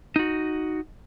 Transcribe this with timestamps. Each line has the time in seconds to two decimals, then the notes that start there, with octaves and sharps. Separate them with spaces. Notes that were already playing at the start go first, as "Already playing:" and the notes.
0.16 D#4 F#4